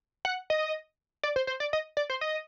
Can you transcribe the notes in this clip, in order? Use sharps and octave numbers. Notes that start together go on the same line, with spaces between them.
F#5
D#5
D5
C5
C5
D5
D#5
D5
C5
D#5